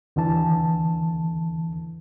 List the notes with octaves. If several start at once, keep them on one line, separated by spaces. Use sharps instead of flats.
D#2 D3 E3 A5